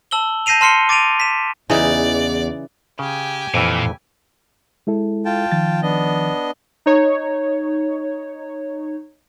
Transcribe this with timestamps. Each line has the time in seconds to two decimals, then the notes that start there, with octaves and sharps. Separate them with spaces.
0.11 A5 E6 F#7 G7
0.46 A5 G6 A#6 C7 D#7 F7
0.61 A5 C6 F6 C7 C#7 G7
0.89 D6 A6 D7 D#7 F7
1.20 B6 E7
1.70 E2 C#3 E3 D#4 D5
2.99 C#3 G4 G#5
3.54 F2 A#2 E3
4.87 G#3 E4 A4
5.25 F4 G5 A5
5.52 D#3 F3 A6
5.82 B3 D4 D#5
6.86 D#4 C#5